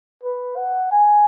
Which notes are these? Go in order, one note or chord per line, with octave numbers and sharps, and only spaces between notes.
B4
F#5
G#5